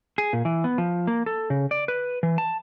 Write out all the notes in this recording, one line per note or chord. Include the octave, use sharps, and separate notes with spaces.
G#4
A#2
E3
B3
F3
A#3
A4
C#3
D5
B4
E3
A5